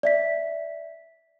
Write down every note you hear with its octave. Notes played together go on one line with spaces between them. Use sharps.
D5 E5 B6